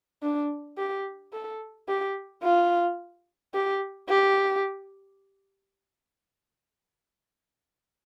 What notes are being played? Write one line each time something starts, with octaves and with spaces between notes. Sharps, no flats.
D4
G4
A4
G4
F4
G4
G4